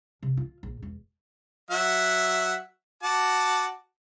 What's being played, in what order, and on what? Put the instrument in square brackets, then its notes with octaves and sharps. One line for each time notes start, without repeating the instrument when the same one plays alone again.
[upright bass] C3
F4
A#1
E1
[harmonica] F#3 E5 F#5
F#4 A5 D6